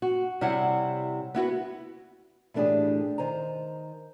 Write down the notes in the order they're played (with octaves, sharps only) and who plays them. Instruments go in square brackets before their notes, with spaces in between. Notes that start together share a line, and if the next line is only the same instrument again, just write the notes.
[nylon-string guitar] F#4
C3 G3 E4 C#5 F#5
B3 E4 F#4 B4
[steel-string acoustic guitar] A2 E3 A3 D4 G4 G#4
D#3 C5 G#5 A#5